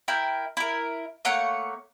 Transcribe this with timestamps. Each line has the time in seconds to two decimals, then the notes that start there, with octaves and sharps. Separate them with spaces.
0.08 E4 A#4 G5
0.57 E4 A#4
1.25 A3 A#3 C#5 F#5